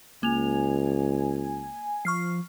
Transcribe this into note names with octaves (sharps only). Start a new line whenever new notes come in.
C#2 A#3 G#5 F7
F3 C#6 F6 C7